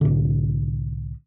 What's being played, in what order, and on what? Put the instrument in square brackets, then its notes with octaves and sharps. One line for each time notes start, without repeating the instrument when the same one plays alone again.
[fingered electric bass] C2 A2 D3